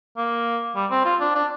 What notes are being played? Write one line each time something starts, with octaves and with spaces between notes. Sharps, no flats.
A#3
G3
C4
F4
D4
D4